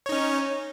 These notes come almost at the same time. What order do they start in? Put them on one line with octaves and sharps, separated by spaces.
C#5 D#4 C#4